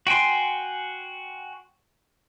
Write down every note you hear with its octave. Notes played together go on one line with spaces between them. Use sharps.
F#4 G5 G#5 C6